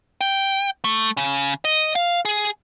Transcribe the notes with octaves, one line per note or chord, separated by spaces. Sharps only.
G5
A3
C#3
D#5
F5
G#4